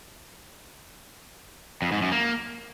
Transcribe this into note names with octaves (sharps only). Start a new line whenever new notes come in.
F2
G#2
F#2
A#3